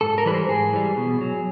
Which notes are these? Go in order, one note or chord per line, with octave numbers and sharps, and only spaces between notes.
G#2 A4
A#4
E3 G3 B4
C5
G#2 G#4
E3 G3
B2
F#3